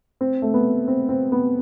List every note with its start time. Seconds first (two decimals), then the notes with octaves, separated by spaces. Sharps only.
0.21 C4
0.42 A3
0.54 B3
0.88 C4
1.09 C4
1.32 B3